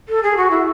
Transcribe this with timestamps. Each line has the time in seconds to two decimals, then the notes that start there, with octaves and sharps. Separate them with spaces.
0.08 A4
0.23 G#4
0.36 F#4
0.50 E4